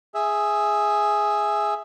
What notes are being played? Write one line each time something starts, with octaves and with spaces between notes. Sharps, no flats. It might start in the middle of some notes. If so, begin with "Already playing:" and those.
G#4 E5